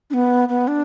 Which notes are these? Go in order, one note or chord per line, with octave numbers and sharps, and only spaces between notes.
D4
B3
B3
D4